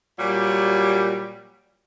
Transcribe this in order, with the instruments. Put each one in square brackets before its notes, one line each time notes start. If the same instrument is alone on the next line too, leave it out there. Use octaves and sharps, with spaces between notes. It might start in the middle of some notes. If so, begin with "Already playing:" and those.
[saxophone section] A#2 F#3 G3